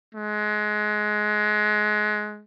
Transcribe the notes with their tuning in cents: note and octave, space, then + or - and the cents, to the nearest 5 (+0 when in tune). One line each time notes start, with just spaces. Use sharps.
G#3 +25